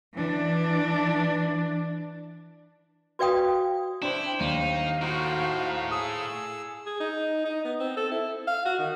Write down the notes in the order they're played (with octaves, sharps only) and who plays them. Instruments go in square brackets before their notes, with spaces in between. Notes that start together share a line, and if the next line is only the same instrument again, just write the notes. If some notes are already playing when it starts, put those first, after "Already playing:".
[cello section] E3 D4
[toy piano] F#4 B4 D5 F5 G5 D#6
[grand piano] D4 C5 [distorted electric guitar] E4 [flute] G5
[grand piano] D#2 [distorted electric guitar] D#4 [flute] F5
[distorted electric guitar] A2 [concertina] D#4 F#4 C5
[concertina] G#4 E6 [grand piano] D#6
[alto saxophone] G#4
D#4
D#4
B3
C4
A4
E4
F5
F#4
D#3